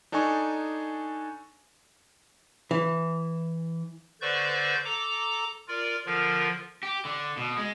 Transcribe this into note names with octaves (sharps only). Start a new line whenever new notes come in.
D4 D#4 A4 G#5 C#6
E3
D3 B4 C5 D5 C#6 G6
A4 A#5 D6
F4 A#4 D5
D3 F3 F4 A#4
G4
D3
B2
G#3